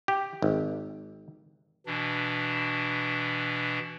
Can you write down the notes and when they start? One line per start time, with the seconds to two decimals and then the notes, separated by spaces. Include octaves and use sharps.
0.08 G4
0.42 G#1
1.86 B2 E3 D4